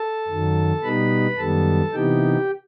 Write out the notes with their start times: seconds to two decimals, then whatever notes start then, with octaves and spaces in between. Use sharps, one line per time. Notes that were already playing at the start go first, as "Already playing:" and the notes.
Already playing: A4 A5
0.28 F#2 D#3 F#3
0.83 B2 G3 B3 D#4 B4 B5
1.38 F#2 D#3 G3 B3 A4 A5
1.93 C3 E3 B3 D#4 G4 G5